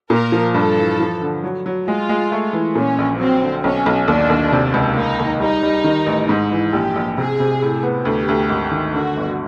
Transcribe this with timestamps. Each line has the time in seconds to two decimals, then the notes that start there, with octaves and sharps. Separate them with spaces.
0.10 A#2 A#4
0.32 F3
0.54 G2 A4
0.77 E3
1.00 F3
1.21 D3
1.44 F#3
1.66 F#3
1.87 G#3 F4
2.09 G#3
2.32 A3
2.53 E3
2.75 A#2 C#4
2.98 A#1
3.19 F#3 C4
3.42 D3
3.63 B1 C#4
3.86 B1
4.08 D#2 D4
4.30 D#2
4.52 C3
4.74 C#2
4.97 A#3 D#4
5.19 D#2
5.40 G3 D#4
5.63 G3
5.84 D#3
6.06 A1
6.29 G#2
6.52 E3
6.73 A#1 G4
6.96 A#1
7.18 C3 G#4
7.40 C3
7.62 A2
7.83 B3
8.05 D2 G4
8.28 D2
8.50 G#1
8.71 D#3
8.94 D3 F#4
9.17 G1